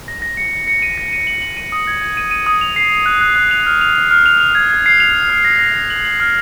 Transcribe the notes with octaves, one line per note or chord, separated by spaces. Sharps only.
A#6
A#6
C#7
C#7
C#7
D#7
A#6
D#7
F#7
F#7
D#7
D#6
G#6
G#6
D#7
D#7
D#6
F7
C7
F7
F#6
F#6
F#6
F7
F6
F7
F7
F6
F7
F7
G#6
G#6
C7
F7
F7
F6
A#6
A#6
A#6
F#7
F#7
F6